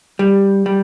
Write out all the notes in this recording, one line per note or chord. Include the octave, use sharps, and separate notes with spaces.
G3
G3